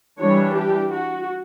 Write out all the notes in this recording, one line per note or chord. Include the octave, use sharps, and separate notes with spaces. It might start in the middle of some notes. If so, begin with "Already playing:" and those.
E3 G3 D4 C#5
G4
F#4